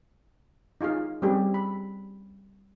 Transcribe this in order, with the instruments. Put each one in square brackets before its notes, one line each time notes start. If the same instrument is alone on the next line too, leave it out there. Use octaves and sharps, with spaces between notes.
[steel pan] D#4 F4 G#4 F5
G3 C4 C#4 G4 G#4
B5